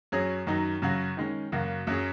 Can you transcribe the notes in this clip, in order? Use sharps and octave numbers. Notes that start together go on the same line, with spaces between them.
F#2 F#3 C#4 G#4 C#5
F#2 D#3 F#3 D#4
F#2 C#3 F#3 C#4 F#4
D#3 G#3 C#4
F#2 C#3 A#3 F#4
F#2 F#3 C#4 G#4